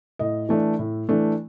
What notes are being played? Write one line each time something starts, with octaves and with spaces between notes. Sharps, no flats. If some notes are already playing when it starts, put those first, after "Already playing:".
A2 D#5
E3 A3 D4
A2
E3 A3 D4